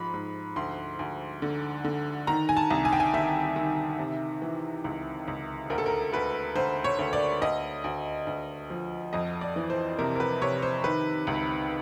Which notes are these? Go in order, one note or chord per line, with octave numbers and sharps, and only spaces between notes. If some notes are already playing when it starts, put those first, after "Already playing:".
Already playing: G#2 F3 B5
G#2
D2 C6
D2
D3
D3
D#3 A#5
G#5
A5
C2
G#5
G5
G#5
D#3 E5
D#3
C3
E3
C#2
C#2
D2 A#4
A4
A#4
D2 B4
D2 C5
C#5
D2
D5
D2 D#5
D2
D2
F3
F2 D#5
D5
E3
C5
C3 A#4
A#4
B4
C3 C#5
C5
D#3 B4
C#2